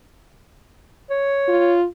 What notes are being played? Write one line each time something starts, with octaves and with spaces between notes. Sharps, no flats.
C#5
F4